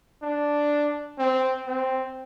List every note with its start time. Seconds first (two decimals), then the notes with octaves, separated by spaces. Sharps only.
0.22 D4
1.19 C4
1.67 C4